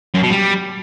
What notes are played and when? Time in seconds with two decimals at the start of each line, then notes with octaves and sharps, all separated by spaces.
0.14 F#2
0.23 B2
0.31 G3